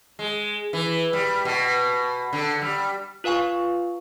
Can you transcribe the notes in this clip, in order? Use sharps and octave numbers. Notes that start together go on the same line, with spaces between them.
G#3
E3
G3
B2
D3
G3
F4 B4 F5 G#5 C#6